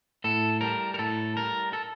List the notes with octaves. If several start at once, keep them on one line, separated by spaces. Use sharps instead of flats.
A2 A4
G3 A#4
A#4
A2 A4
G3 A#4
A4